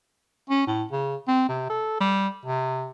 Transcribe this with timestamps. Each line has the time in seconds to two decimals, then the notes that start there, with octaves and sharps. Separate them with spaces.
0.50 C#4
0.67 A2
0.92 C#3
1.28 C4
1.49 C3
1.70 A4
2.00 G3
2.45 C3